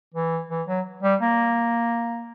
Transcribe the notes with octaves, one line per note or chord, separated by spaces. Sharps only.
E3
E3
F#3
G3
A#3